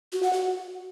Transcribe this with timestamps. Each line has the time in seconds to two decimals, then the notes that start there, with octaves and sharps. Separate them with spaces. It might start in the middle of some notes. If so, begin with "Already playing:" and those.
0.13 F#4
0.23 F#5
0.33 F#4